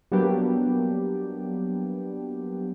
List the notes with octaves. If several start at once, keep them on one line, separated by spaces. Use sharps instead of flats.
F#3 G3 A#3 B3 D4 G4